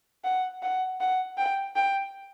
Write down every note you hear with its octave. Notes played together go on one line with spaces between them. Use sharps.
F#5
F#5
F#5
G5
G5